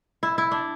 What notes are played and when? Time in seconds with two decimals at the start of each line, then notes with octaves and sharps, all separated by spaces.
0.23 E4
0.38 E4
0.51 D4